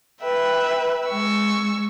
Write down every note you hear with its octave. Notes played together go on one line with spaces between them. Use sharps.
B4 E5 G5
G#3 C#6 E6